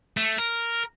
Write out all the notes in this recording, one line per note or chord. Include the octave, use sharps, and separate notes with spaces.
A3
A#4